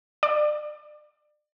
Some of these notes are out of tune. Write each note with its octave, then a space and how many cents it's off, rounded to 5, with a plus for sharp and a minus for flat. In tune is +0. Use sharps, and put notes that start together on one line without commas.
D5 +30